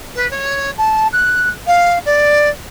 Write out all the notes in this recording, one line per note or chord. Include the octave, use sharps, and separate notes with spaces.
B4
C#5
A5
F#6
F5
D5